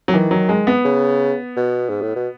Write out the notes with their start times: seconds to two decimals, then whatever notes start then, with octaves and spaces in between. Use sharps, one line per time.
0.08 F#3
0.14 D#3 E3
0.31 F#3
0.49 G#3
0.67 B3
0.85 C#3
1.56 B2
1.89 G#2
2.02 A2
2.16 B2